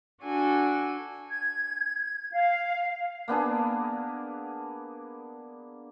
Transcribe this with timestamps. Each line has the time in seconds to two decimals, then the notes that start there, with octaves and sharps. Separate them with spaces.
0.23 D4 F#4 A4 G#5
1.29 G#6
2.32 F5
3.28 A#3 B3 D4 G#4